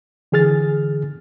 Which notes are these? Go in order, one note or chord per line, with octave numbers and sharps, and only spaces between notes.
D3 E3 G#4 F6 A6